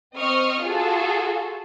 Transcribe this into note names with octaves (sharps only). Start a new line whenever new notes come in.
C4 D#5 C#6 D#6 F6
F4 F#4 G#4 A4